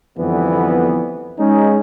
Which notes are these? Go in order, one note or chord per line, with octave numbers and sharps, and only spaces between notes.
F2 D3 E3 G3 B3
G#3 C#4 D#4